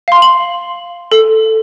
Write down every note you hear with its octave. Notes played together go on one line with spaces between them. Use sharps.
F5 C6
F#7
A4